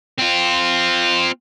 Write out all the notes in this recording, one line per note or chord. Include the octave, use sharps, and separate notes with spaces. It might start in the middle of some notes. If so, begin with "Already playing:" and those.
C4 F4